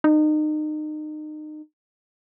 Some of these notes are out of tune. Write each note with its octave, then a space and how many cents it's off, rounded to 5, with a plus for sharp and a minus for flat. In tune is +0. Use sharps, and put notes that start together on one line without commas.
D#4 -30